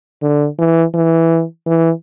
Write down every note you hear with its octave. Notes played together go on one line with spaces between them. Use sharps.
D3
E3
E3
E3